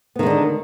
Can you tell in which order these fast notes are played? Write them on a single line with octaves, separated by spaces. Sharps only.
B3 D#3 G#3 D3 D4